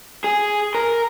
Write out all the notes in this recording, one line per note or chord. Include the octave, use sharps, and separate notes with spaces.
G#4
A#4